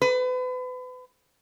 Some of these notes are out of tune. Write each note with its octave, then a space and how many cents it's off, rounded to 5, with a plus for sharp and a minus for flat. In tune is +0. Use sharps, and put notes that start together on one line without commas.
B4 +35